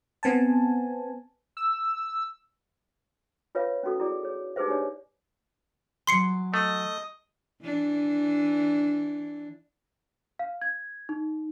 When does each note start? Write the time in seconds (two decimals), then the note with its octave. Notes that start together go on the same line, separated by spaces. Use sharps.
0.23 B3 C4 G#5 A5
1.57 E6
3.55 F4 B4 C#5 E5 F5
3.83 C#4 D#4 F#4 A4
4.00 E4 F#4 G#4 D5
4.23 G#4 C#5
4.56 D#4 G4 G#4 B4 C5 E5
4.68 D4 G4 C#5 D5
6.07 E3 F#3 C6 C7 C#7
6.54 A3 D#5
7.62 E3 D4
10.39 F5
10.62 G#6
11.09 D#4